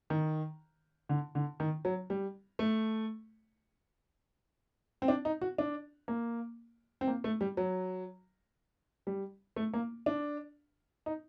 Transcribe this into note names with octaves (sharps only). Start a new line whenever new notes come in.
D#3
D3
D3
D#3
F#3
G3
A3
C4
D4
D#4
F#4
D4
A#3
C4
A#3
A3
G3
F#3
G3
A3
A#3
D4
D#4